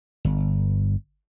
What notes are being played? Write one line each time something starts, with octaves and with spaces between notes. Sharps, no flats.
G1